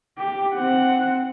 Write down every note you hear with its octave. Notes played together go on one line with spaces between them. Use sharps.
G4
C4 F#5